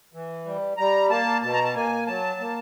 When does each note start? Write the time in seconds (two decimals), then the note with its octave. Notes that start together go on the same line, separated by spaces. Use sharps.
0.13 E3
0.45 G3
0.77 G3 A#5
1.10 A#3 A5
1.42 B2 A5
1.53 A#5
1.64 A5
1.75 A#3 G#5
2.07 F#3 A5
2.40 A#3